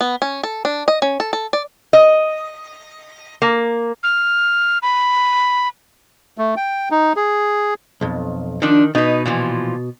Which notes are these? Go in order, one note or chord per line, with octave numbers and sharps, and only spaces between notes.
B3
C#4
A4
D4
D#5
C#4
A4
A4
D5
D#5
A#3
F6
B5
A3
G5
D#4
G#4
B1 F2
D#3 F3 D4
B2 D#4 B4
A#2 E3 F3